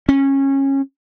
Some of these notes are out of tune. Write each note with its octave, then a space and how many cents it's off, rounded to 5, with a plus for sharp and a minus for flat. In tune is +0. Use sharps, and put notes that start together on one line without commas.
C#4 -20